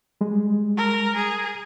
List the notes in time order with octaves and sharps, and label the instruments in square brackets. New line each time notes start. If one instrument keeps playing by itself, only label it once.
[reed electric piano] G3 G#3
[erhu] A#4
[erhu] G#4 [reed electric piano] A#5